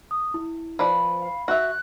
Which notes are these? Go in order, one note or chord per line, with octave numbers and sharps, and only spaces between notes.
D#6
E4
F3 B4 D5 B5
F5
F#4 E5 F#6